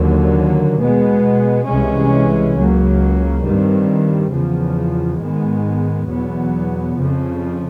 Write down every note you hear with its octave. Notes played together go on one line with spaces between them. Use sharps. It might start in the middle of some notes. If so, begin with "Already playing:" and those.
Already playing: D#2 D3 F#3 A#3
B2 G#3 B3
C2 C3 E3 G#3 C#4
C#2 C#3 F#3 A#3
G2 D#3 G3 C4
E2 C#3 F3
G#2 D#3 G#3 B3
E2 B2 F#3 B3
F2 C#3 F3